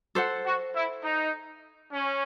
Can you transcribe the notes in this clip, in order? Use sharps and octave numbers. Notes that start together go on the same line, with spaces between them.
A4 C5 F#5
F#4
E4
D#4
C#4